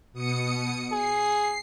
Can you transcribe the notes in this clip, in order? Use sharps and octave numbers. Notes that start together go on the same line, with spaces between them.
B2 D#6 C#7
G#4 C7